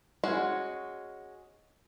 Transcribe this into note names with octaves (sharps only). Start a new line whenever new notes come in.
G#3 C#4 F#4